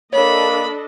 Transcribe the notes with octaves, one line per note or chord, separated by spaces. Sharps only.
A#3 D4 A4 C#5 D#5 B5